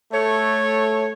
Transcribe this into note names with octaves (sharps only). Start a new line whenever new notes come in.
A3 C#5